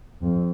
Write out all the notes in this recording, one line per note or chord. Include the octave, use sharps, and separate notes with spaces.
F2